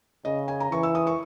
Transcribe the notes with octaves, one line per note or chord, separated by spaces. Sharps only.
C#3 D#5
G#5
A#5
E3 C#6
E6
D#6
C#6